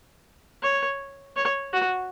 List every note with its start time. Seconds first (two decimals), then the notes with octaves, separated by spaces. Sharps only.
0.62 C#5
1.36 C#5
1.73 F#4